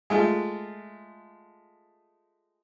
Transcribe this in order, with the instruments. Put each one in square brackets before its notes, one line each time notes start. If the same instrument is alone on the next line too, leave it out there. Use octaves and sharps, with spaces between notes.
[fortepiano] G#3 A3 F4